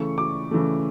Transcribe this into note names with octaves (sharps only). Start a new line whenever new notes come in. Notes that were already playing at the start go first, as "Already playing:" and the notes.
Already playing: C#3 E3 A3 C#6
D6
C#3 E3 A3